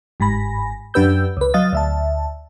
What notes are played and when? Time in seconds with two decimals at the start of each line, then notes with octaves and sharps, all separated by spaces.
0.20 G1 G#2 G#5 B5 A#6
0.94 F#2 D4 G4 B4 E6 G6
1.37 C#2 B4
1.54 F#3 D#5 F5 D#6 A6
1.73 D2 E5 A5